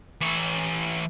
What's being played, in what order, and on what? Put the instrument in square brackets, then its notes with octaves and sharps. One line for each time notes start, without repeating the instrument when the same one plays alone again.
[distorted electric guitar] E3 C#5